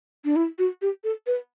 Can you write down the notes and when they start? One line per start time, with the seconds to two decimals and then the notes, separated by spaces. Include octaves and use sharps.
0.25 D4
0.36 E4
0.59 F#4
0.82 G4
1.04 A4
1.27 B4